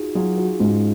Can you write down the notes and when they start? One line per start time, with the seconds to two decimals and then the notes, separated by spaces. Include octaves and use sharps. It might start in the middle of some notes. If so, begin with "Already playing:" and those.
Already playing: D#4 F4 F#4 G#4
0.15 F#3 F4 G#4
0.37 F#4
0.59 G#2 C#4 F4